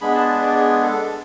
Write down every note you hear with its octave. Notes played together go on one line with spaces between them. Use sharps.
G#3 B3 D4 G#4 B5
A5
A5
D5
G#4
A4